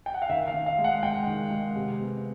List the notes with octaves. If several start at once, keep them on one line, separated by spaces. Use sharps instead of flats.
G5
F#5
F5
D#3 E5
F5
D#3
F5
G#3
F#5
G#3 G5
D#3
G#3
C3
B3